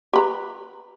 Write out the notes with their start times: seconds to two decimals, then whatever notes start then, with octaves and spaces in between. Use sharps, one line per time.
0.13 G4 B4 A#5